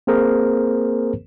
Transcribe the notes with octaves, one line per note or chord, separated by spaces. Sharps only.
A#3 C4 G#4 A#4 C5